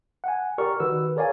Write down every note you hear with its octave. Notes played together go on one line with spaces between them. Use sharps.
F#5 G#5
G4 A#4 D5 C#6 F6
D#3 F#4 B4 E6
G#4 A#4 C#5 D5 F5 G#5